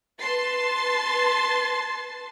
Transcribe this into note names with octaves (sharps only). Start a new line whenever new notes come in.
B4 A5 C6 A6 C7